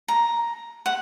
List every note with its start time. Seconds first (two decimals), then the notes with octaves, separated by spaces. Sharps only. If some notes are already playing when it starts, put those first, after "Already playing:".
0.08 A#5
0.86 F#5